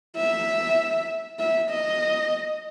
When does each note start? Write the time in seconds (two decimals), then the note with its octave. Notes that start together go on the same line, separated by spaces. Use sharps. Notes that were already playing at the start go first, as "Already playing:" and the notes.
0.17 E5
1.40 E5
1.71 D#5